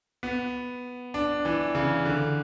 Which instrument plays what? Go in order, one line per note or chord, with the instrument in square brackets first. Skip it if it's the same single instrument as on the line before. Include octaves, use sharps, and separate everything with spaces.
[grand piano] B3
D4
E3
C#3
D3